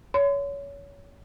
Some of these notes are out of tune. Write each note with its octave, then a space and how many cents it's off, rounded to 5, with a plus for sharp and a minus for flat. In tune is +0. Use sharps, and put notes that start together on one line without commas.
C#5 +25 C6 -35